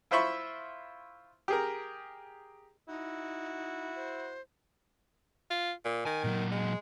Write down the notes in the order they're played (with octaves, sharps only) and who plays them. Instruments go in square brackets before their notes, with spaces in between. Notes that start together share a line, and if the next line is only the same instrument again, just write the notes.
[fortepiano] E4 F4 C5 E5 B5 C#6
G4 G#4 A#4
[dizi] D#4 [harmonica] E4 [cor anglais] F#4
[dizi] C5
[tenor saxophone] F4
A#2
[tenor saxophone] D#3 [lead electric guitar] G#5
[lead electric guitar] A#2 F#3
[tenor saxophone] G#3